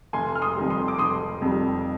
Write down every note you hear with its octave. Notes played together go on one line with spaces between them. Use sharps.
F1 G#5 C6
F6
C6 D#6
F2 D#3 G3
C6 D#6
D6
F1 C6 D#6
F2 D#3 G3